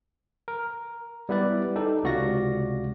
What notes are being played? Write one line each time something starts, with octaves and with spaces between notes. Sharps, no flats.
A#4
G3 B3 E4 B4 D5
D#4 G4 A4
C#2 C3 F#4 D5 F5 A#6